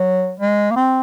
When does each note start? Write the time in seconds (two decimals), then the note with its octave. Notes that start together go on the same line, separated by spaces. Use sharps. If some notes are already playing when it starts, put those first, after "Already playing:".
Already playing: F#3
0.40 G#3
0.71 A#3
0.76 C4